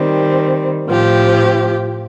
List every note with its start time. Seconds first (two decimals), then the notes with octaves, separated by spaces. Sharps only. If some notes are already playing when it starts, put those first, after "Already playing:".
Already playing: D#3 G3 C4
0.88 A2 F3 C4 G4